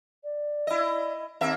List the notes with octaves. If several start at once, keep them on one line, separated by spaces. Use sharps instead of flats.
D5
E4 D#5
D#2 A#3 C4 E5